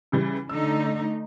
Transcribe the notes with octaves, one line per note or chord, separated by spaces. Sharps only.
C#3 E3 G3
D3 A3 D#4 E6